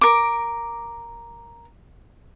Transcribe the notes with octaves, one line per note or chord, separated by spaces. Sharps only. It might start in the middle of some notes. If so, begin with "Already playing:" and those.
A#4 D6